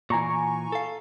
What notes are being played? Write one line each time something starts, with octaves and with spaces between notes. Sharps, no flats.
A#2 E3 G#5 A#5 C#6
A4 F5